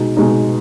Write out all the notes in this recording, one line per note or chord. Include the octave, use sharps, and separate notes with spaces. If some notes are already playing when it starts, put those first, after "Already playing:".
Already playing: B2 G#3 D#4
B2 G#3 D#4